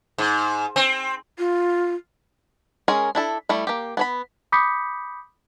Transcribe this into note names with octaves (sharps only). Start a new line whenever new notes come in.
G#2
C4
F4
G#3 C#4 G#4 A#4
D4 E4 A4
G3 A3 E4
A#3 G4
B3 C#5 B5
B5 D6 D#6 G6 B6 C#7